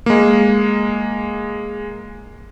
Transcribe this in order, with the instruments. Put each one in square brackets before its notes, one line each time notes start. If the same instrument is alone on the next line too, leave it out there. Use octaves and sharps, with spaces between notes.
[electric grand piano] G#3 A#3